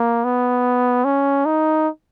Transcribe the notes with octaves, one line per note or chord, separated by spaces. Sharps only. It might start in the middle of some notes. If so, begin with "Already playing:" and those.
Already playing: A#3
B3
C#4
D#4